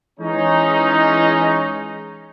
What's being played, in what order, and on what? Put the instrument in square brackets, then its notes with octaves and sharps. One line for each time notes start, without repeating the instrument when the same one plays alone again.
[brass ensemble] E3 G#3 C#4 D#4